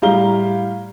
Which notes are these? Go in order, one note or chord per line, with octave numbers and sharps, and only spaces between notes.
A2 G3 F5 A#5 G7